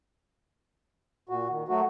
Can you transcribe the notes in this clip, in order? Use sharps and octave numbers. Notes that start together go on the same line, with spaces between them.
A#2 F#4
D#3
F#3 A3 F#4